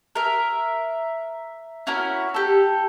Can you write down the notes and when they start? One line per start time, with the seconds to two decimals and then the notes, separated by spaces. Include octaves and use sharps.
0.15 A#4 E5
1.87 C#4 E4 F#4 A#4
2.34 G4 A4